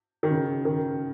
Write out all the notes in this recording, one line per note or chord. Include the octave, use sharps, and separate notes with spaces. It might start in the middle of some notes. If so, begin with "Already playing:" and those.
D#3
C#3
D#3